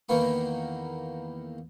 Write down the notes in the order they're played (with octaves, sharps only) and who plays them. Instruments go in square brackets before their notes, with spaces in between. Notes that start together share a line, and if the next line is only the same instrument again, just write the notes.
[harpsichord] E2 D#3 A#3 B3 C#6